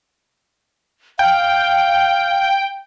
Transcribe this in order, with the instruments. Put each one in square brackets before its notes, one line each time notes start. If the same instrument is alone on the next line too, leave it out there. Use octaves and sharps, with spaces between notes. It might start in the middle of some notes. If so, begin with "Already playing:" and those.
[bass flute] F5 [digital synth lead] G5